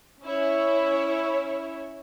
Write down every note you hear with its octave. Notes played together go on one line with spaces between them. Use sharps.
C#4 E4 C#5